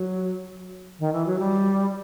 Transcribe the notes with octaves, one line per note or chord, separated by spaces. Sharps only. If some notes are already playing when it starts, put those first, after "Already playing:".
Already playing: F#3
D#3
E3
F#3
G3